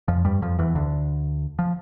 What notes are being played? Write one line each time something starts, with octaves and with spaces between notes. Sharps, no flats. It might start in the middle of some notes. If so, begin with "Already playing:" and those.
F2 F3
G2 G3
F2 F3
E2 E3
D2 D3
F3